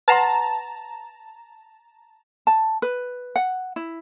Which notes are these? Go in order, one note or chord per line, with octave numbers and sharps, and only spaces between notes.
B4 F#5 A5 A#5 C6
A5
B4
F#5
E4